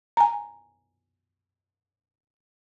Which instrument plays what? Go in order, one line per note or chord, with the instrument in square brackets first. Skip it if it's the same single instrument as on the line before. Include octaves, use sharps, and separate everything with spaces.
[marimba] G#5 A#5